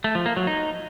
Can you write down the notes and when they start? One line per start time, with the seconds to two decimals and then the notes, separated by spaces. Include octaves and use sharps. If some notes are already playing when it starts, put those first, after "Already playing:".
0.04 A3
0.15 F3
0.26 A#3
0.36 F#3
0.47 D#4